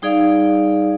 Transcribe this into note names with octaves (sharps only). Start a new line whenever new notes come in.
G3 D#4 G#4 D5 F5